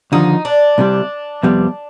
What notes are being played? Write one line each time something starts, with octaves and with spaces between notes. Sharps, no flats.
D#2 D3 F3 D#4
D4
C2 C3 G3
F2 C3 G3 B3